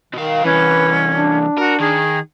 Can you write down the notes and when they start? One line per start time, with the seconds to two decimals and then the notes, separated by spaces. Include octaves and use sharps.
0.13 B2 D#3 F5
0.44 C2 E3 C#4 B4
1.14 D4
1.58 F#4 A#4
1.80 D#3 G#4